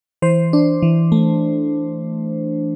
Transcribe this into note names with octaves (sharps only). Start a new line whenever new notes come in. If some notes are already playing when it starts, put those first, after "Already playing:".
E3 C5
D4
E3
A3